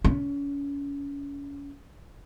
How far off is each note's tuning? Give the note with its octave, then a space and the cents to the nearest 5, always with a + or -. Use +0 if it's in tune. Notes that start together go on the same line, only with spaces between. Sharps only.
C#4 +30